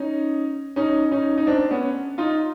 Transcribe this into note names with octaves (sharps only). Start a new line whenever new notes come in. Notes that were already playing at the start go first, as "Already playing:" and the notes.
Already playing: C#4 D#4
C#4 D#4
C#4 D#4
D#4
C4 D4
B3 C#4
D#4 F4